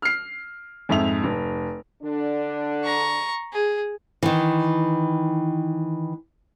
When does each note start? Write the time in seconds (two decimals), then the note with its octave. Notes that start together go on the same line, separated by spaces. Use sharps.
0.02 F6 C7
0.89 F2 G#2 E5 F7
1.24 F1
2.03 D3 D4
2.84 A#5 C#6
3.53 G#4
4.23 D#3 E3